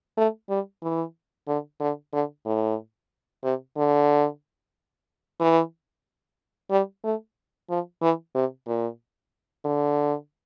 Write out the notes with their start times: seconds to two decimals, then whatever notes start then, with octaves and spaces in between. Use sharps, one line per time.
0.17 A3
0.49 G3
0.83 E3
1.47 D3
1.81 D3
2.13 D3
2.45 A2
3.43 C3
3.77 D3
5.40 E3
6.70 G3
7.04 A3
7.69 F3
8.01 E3
8.35 C3
8.67 A#2
9.65 D3